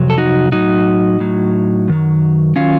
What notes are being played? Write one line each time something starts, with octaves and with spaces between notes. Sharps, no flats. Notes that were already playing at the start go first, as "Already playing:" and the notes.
Already playing: F2 C3 F#3
A4
D#4 F#4
A2 F#3 D#4 F#4
A2 F#3
F#2 D#3 F#3
D#3 F#3 C#4 F4